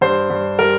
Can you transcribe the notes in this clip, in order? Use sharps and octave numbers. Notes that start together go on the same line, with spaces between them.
G2 C5
G2
G3 A#4